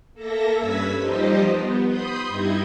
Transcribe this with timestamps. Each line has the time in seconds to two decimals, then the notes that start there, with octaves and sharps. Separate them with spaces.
0.14 A#3 A4 E5 A#6
0.56 G2 C#4 B4 E6 G#6 B6
0.99 F3 G3 D#4 G4 C5 D#5
1.41 B3
1.86 B5 C6 D#6 G6
2.28 G2 G3 D#4 E4 D#5 G#6